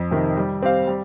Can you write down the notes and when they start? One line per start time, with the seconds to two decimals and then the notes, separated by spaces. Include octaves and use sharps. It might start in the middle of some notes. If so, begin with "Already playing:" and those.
Already playing: F2
0.11 C3 D#3
0.37 G3
0.62 C4 G4 C5 F5
0.87 G3